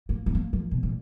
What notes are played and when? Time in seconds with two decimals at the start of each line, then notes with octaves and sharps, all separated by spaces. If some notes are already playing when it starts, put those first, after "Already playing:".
0.09 A#3
0.26 B3
0.35 A#3
0.53 F3
0.71 B2
0.83 A#2